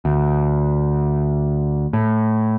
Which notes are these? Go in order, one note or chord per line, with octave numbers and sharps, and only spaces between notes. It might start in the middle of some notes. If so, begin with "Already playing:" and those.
D2
A2